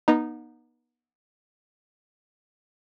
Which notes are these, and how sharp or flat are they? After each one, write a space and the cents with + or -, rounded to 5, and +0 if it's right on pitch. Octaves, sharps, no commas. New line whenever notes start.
B3 -35 D#4 -10